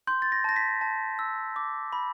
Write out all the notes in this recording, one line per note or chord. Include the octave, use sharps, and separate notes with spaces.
C6 G6
A6
A#6
A5 A#6
B6
A5
E6
D6
B5